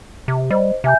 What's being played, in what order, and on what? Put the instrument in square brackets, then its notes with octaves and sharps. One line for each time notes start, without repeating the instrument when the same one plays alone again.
[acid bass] C3
[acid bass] G3 [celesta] C5 D#5
[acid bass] C3 [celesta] E5 G#5 G6